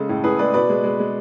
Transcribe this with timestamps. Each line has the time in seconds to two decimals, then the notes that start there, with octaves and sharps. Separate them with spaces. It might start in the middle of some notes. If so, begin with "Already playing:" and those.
Already playing: C#3 G#3 A4
0.09 A2
0.24 A2 G#4 B4
0.39 G#3 B4 D5
0.54 B2 B4 D5
0.69 G#3
0.84 G#3
0.99 G#3